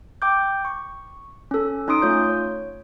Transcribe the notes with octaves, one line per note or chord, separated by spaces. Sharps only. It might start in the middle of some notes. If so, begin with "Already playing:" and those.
G5 D6 G6
C#6
C#4 A4
C#4 D#4 C6 D#6 D7
A3 F4 C#5 G6
C#5